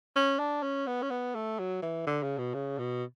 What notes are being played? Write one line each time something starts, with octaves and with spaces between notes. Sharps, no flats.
C#4
D4
C#4
B3
C#4
B3
A3
F#3
E3
D3
C#3
B2
C#3
B2